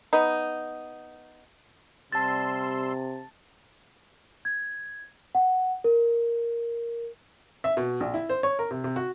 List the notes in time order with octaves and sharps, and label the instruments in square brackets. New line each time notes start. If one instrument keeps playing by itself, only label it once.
[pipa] B3 D#4
[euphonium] C3 [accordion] G3 C6 E6 [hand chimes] A5 A6
[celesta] G#6
F#5
A#4
[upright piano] E5
B2
A#1
E4
C5
C#5
A#4
C3
C3
F#4